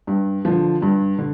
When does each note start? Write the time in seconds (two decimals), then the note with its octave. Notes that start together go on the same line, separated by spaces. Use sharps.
0.07 G2
0.45 D3 F3
0.82 G2
1.19 D3